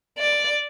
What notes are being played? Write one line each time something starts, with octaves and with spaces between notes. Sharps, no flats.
D5